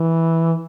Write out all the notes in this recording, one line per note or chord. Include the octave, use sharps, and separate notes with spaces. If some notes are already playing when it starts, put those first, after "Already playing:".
Already playing: E3